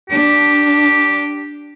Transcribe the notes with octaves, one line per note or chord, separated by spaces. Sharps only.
D4 G4